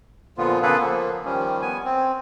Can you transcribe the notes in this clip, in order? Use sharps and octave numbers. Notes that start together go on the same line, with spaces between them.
A#2 D3 F3 B3 F4
C#3 A#3 B3 G#4 A4 B4
F3 A#3
D#3 F3 G3 C#4
B3 G#5
C4